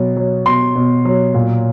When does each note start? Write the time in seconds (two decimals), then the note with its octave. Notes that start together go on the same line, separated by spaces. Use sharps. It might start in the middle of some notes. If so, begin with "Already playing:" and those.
Already playing: B2 F#3
0.16 F#3
0.46 B2 C6
0.76 B2
1.05 F#3
1.34 A#2